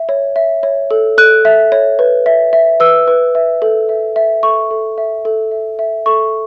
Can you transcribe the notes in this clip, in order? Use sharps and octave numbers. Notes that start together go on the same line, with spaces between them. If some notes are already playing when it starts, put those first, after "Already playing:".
Already playing: E5
C#5
E5
C#5
A4
A4 F#6
E5
C#5
B4
E5
E5
B4 E6
B4
E5
A4
E5
E5
A4 C#6
A4
E5
A4
E5
E5
A4 C#6